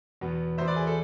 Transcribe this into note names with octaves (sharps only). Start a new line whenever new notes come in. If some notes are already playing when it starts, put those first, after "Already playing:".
E2 B2 B3
E2 B2 B3 C5 E5
B4 D5
G#4
A4